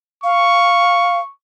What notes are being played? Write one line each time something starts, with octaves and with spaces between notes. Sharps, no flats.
F5 C#6